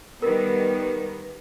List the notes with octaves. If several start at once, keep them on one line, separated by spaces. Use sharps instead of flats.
D#3 G3 B3 A#4 B4